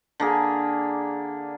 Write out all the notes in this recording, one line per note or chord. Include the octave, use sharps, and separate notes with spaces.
D3 A#3 G#4